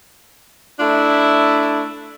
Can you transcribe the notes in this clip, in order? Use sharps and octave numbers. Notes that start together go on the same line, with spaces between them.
A3 D4 E4